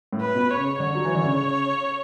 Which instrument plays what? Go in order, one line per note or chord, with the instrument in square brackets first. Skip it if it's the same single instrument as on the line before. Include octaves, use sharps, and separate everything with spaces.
[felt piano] A2
[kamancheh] B4
[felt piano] B2
[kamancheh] C#5
[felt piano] C#3
[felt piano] D3 [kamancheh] C#5
[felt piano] F#3
E3
D3
C#3